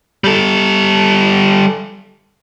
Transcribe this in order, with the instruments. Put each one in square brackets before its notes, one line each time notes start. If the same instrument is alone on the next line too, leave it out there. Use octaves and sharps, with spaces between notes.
[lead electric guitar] G3 A4